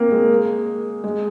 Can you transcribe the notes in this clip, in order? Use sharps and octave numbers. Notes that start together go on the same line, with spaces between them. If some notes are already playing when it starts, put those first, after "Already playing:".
Already playing: A#3 C4
G#3
G#3